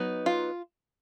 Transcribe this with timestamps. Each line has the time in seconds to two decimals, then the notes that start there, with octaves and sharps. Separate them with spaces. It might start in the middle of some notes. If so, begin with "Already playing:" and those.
Already playing: F#3 B3 D#4
0.26 F4